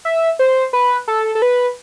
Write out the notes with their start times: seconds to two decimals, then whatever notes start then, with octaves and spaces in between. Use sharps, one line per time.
0.05 E5
0.39 C5
0.73 B4
1.08 A4
1.35 A4
1.42 B4